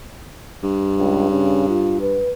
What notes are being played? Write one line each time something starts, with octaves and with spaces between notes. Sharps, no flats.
G2
C#2
C#3
F4
B4